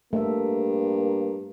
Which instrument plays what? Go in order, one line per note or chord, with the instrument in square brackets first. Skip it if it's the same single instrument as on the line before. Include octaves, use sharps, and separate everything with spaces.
[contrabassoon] G2 [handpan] A3 A4 E5 [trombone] A#3